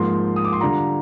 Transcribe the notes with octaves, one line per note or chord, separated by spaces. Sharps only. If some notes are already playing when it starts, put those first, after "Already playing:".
Already playing: G#2 F3 A#3 C6
D#6
D6
C6
D3 G3 D4 F4 A#5